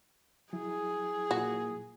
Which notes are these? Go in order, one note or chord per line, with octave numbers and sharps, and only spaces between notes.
F#3 E4 G#4
A#2 F#4